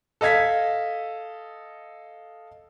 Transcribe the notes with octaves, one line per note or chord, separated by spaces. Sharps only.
A4 D#5 F5 G#6 B6